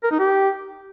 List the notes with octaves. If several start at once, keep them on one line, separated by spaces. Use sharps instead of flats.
A#4
D#4
G4